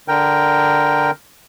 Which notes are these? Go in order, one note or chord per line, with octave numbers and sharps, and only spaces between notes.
D3 A#4 G5